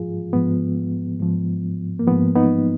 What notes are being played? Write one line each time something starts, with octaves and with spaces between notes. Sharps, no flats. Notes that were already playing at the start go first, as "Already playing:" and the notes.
Already playing: G#2 F3 F4 G#4
G#2 F3 B3
G#2 F3
A#3
G#2 F3 B3
B3 D#4